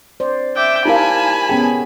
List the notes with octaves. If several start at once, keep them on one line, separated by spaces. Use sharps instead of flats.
C5 D5
E5 G5 D6
D#4 E4 G4 A#4 F5 G#5 A5 B5
B3 C#4 G#4 G5